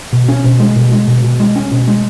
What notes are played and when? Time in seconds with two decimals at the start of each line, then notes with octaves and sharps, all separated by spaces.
0.13 B2
0.29 C#4
0.44 B2
0.60 G#3
0.76 B2
0.92 G#3
1.08 B2
1.24 B2
1.40 G#3
1.56 C#4
1.72 B2
1.88 G#3